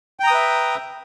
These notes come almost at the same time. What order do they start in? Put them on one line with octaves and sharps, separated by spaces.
G5 A#5 D#6 B4 E5